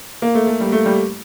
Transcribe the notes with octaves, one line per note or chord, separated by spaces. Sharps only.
A#3
A3
A3
G3
A3
G3